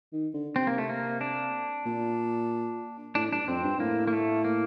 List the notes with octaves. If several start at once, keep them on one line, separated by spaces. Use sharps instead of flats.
D#3
D3
C3 C4
A#3
A3
A#3
D4
A#2
A2 D4
G2 D4
F2 C4
G2
A2 A#3
A#3
A3
A#3